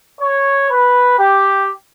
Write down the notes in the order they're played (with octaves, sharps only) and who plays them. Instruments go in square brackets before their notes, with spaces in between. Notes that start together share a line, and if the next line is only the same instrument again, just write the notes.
[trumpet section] C#5
B4
G4